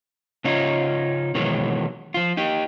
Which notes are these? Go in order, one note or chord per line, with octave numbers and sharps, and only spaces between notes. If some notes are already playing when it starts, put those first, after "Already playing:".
C#3 C#4 D#4 F4
B2 D#3 E3 F#3 G#3
F3 F4
D#4 G4